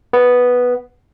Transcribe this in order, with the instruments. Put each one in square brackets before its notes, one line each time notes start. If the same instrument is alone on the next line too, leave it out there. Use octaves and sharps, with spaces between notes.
[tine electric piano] B3